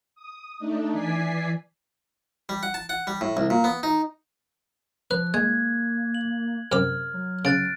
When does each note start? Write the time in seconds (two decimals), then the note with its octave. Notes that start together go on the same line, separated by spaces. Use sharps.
0.15 D#6
0.59 A3 D4 D#4
0.92 E3 D5 G#5 B6 C7
2.49 G3
2.63 F#5
2.74 A5
2.89 F#5
3.07 G3
3.21 A2
3.37 C2
3.50 A#2
3.64 B3
3.83 D#4
5.11 F3 B4 F#6
5.34 G#3 A#3 G#6
6.15 F#7
6.72 F#2 C3 D6 F6
7.13 F#3
7.45 C#3 F#6 A6 D7